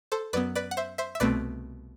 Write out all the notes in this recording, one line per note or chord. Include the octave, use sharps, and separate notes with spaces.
A4 C5
F#2 F#3 B3 B4 D5
B4 D5
F#5
C5 E5
C5 E5
E5
C2 B2 A3 C4 B4 D5